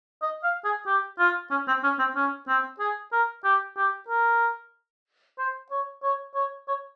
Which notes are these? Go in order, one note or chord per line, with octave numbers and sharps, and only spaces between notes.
D#5
F5
G#4
G4
F4
C#4
C4
C#4
C4
C#4
C4
G#4
A#4
G4
G4
A#4
C5
C#5
C#5
C#5
C#5